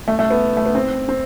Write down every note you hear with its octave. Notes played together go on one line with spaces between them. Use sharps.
A3
A3
B3
A3
B3
C4
C4